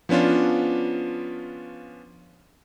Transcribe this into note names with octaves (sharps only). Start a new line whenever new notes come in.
F3 B3 C#4 D4 F4